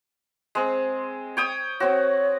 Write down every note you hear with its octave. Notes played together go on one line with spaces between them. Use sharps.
G#3 C4
C#5 G5 D#6
C4 F#4 C#5